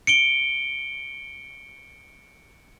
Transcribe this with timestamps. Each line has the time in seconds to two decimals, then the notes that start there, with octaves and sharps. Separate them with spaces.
0.07 C#7 D7 G7